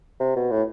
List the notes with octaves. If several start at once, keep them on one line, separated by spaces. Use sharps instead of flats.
C3
B2
A2